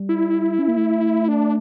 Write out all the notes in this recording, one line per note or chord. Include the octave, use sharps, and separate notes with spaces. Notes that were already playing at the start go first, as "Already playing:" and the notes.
Already playing: G3
E4
C#4
A#3
A3
D4